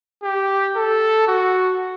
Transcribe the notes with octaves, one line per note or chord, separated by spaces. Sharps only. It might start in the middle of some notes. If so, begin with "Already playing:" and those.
G4
A4
F#4